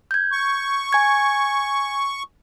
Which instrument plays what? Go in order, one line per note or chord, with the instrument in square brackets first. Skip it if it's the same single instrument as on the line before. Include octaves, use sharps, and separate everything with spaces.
[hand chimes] G6 G#6
[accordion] C#6
[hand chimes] G#5 G#6